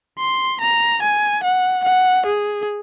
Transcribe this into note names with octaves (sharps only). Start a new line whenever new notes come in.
C6
A#5
G#5
F#5
F#5
G#4